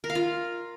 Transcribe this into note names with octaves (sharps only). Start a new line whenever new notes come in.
A#4
F5
F4